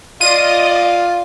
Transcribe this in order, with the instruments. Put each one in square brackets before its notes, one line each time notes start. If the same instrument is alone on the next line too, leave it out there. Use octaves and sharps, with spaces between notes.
[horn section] F4 [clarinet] D5 [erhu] D#5 [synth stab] D#7